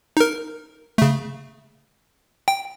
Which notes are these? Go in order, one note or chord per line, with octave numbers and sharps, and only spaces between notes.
D#4 A#4
C#3 A3
G5